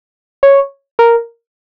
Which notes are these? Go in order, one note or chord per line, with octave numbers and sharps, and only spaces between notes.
C#5
A#4